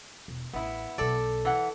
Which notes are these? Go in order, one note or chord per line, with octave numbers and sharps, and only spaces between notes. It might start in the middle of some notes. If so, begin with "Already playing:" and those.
E1
A1 B3 E4
B1 B2 A4 D5
E3 F#5